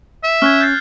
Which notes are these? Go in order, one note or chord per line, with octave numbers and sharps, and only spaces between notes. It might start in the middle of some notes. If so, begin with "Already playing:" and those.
E5
C#4 F6 F#6 G#6
G6 A6 C7